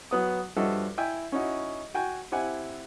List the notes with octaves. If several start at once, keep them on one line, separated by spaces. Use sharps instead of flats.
F#3 B3 D#6
G2 F3 F#4 A4 D#5 E5
E4 E5 G5 G#5
C#4 D#4 E4 F#4
F#4 G5 G#5
C4 E4 G4 F#5 G#5